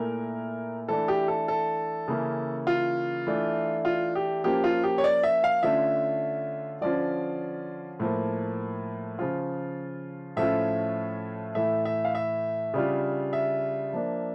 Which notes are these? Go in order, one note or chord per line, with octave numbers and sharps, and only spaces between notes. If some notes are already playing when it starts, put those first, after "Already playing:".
Already playing: A#2 A3 E4 A#4
E3 A3 D4 A4
G4
A4
A4
C#3 E3 A#3 C#4
F4
E3 A3 D4
F4
G4
F3 A#3 C#4 F4 G4
F4
G4
C#5
D5
E5
F5
D3 A3 C#4 F4 E5
D3 F3 C#4 F4 D5
A2 F3 A#3
C#3 F3 C#4 F4
A2 F3 A3 C#4 F4 E5
A2 E3 A3 E5
E5
F5
E5
C#3 G3 D4 F4
E5
F3 A#3 D4